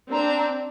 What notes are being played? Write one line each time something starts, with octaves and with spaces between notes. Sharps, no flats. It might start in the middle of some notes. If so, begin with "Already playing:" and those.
C4 D4 A#5